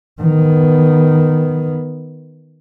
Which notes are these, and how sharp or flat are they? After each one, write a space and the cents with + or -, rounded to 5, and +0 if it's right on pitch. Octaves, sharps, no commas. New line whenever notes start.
D#3 +0 B3 +0